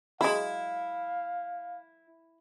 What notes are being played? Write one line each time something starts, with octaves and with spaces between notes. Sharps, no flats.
F#3 G#3 E4 F5